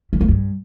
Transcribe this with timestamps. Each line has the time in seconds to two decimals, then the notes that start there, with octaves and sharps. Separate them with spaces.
0.13 E3
0.21 A#3
0.29 G2